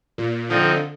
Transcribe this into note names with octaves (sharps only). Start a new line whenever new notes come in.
A#2
D3 F3 C4 D#4